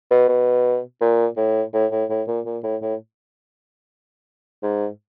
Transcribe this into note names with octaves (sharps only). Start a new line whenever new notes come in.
B2
B2
A#2
A2
A2
A2
A2
A#2
A#2
A2
A2
G#2